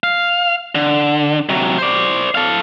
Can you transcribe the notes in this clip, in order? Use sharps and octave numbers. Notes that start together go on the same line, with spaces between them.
F5
D3
C3 F#3
C5 D5
A4 F5